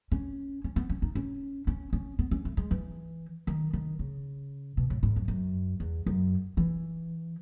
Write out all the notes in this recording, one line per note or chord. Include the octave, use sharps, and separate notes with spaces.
C#4
C#4
B3
C#4
D#4
C#4
C#4
C#4
B3
C#4
A3
G#3
E3
D#3
D#3
C#3
B2
A2
G#2
F#2
F#2
E2
F#2
E3